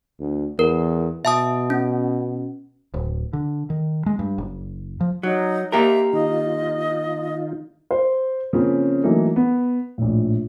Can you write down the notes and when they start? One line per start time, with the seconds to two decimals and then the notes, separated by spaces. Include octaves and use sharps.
0.20 D2
0.59 E2 A#4
1.25 B2 E5 A5 D#6
1.70 C#4
2.94 D1
3.33 D3
3.70 D#3
4.06 G#3
4.19 G2
4.38 F#1
5.01 F3
5.23 F#3 D#4
5.72 A#3 G4 A#4 E5
6.13 D#3 D#4 F4 D#5
7.91 C5
8.53 C#3 F3 A#3 C4 C#4
9.04 E3 F#3 A3 A#3 D#4
9.36 B3
9.98 A#1 A2